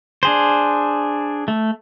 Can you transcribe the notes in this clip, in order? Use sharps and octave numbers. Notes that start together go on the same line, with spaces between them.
D4 G#4 C5
A3